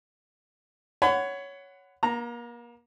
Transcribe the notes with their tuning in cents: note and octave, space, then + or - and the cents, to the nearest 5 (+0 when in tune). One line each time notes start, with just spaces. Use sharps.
C#5 +10 F#5 +5 B5 +35
A#3 +35 A#5 +0